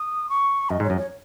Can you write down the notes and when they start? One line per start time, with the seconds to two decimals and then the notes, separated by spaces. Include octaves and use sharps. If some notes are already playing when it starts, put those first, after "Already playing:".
Already playing: D#6
0.29 C#6
0.70 F#2 D#5
0.80 G#2
0.84 C#5
0.90 F#2
0.97 C#5